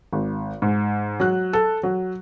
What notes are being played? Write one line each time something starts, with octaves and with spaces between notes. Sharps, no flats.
G#1
G#2
F#3 F#6
A4
F#3